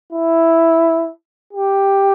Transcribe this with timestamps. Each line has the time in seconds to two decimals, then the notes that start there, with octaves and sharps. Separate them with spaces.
0.13 E4
1.53 G4